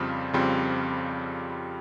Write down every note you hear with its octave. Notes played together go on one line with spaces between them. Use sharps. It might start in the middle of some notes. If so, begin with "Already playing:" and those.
Already playing: F2 C#3 G3 C4 F4
F2 C#3 G3 C4 F4